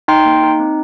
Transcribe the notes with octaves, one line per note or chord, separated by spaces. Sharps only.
D#4 G5 C6
A#3
D#4
C4